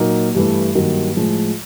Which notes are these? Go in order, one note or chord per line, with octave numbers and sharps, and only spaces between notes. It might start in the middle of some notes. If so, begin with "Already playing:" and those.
Already playing: A#2 F#3 A#3 D#4
G2 E3 A3
G2 D#3 F#3 A#3
A2 F3 G#3